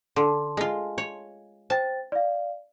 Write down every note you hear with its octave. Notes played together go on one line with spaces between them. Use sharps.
D3 A5 C6
G#3 F4
C#5
C5 G5 A5 A6
D5 F5